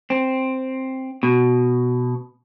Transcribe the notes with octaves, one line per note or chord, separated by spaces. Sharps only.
C4
B2